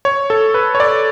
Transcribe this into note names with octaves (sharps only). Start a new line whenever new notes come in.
C#5
A4
B4
C#5
D5